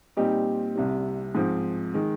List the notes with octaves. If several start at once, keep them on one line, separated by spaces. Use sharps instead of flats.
A#2 G3 C4 D#4 G4
C2 C3 G3
G#2 F3 C4
D#3 G#3